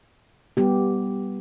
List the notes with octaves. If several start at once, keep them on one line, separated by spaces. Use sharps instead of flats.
G3 B3 G4